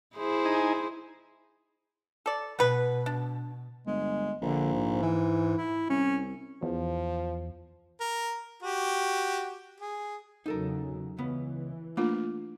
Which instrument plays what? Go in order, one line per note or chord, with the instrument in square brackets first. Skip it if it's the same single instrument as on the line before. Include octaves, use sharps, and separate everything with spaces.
[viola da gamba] E4 G#4 C5
[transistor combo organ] D#4 G#5
[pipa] A4 D5
[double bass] B2 [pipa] B3 B4
[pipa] D4
[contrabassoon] G1 [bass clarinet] G#3
[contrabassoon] A#1 [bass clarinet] D3
[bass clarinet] G#2
[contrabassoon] E3
[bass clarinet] E4
[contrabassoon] C2 [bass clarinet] C#4
[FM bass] E2 [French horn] F3
[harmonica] A#4
F#4 G4
G#4
[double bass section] E2 C#3 F#3 [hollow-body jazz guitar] D#4 A4 A#4
[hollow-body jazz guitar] C#2 B3 [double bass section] E3
[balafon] A3 D4 F4 [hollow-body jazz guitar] A#3